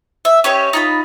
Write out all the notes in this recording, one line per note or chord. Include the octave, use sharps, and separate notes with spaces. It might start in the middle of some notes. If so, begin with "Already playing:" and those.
E5
C#4 G4 C#5 D#5
D#4 F4 B5